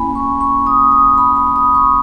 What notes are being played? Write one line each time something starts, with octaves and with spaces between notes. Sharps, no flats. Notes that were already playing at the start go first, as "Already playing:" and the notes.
Already playing: A#3 C#4 E4 G#5 B5
C#6
C#6
D#6
D#6
B5
B5
D#6
C#6